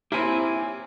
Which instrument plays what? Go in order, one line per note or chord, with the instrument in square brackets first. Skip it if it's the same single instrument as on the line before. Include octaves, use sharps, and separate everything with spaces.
[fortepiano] A#3 C4 [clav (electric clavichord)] E4 [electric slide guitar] G4 C#5 G#5